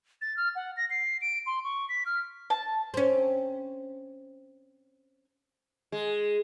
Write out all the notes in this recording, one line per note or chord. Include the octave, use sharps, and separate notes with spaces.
A6
F6
F#5
A#6
C7
D7
C6
C#6
B6
F6
A5
C4 C#4
G#3